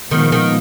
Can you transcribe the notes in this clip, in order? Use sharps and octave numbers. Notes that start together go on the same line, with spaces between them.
A#2 D#3 F3 G#3 B3
D#3